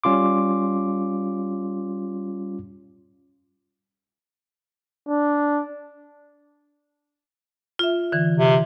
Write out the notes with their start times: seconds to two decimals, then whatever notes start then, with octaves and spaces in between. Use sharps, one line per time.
0.04 G3 C#4 F4 C6 D6
5.08 D4
7.79 F4 E5
8.12 D3 E3
8.38 C3